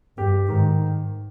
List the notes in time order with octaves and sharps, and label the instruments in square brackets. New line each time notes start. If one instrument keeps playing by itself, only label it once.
[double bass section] G2 [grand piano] G4
[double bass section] G#2 [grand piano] D#3